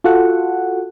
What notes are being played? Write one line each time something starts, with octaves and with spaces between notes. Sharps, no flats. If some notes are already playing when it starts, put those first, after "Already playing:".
F4 F#4 A4 F#5